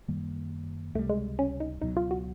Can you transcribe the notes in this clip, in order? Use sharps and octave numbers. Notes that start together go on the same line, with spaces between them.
F#2 D#3 G3 A#3
C#2 C3 D#3 G3 A3
G#3
C#4
D#4
C#2 B2 F#3 D#4
F4
F#4